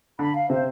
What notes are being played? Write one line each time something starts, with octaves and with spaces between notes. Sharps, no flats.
D3 B5
F5
C3 C5